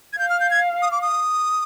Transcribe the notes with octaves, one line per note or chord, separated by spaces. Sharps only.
G#6
F5 G6
F6
G6
G#6
D#6
D6
D#6